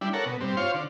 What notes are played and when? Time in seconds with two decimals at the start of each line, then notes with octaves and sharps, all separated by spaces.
0.01 G3 D4 E4
0.13 A4 A#4 C#5 F#5
0.25 B2
0.41 G2 C4
0.57 F4 C5 C#5 F5
0.74 D3